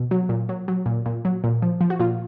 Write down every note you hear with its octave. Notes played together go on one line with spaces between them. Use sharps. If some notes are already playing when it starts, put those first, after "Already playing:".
Already playing: B2
F#3
A#2
F#3
F#3
A#2
A#2
F#3
A#2
F3
F3
F#4
A#2 F4